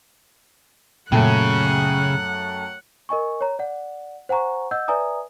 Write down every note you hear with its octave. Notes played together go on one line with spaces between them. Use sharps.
F#2 A#2 C#3 A3 F#5 G5
A#4 D#5 G#5 C#6
C#5 A#5
D5 F#5
C5 F#5 G#5 A#5 C#6
D#5 F#5 E6 G6
B4 D5 E5 G#5 A#5 D#6